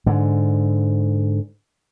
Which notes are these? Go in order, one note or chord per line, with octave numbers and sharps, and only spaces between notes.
G#2 D3